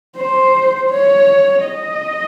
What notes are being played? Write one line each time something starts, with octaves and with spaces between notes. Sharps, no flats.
C5
C#5
D#5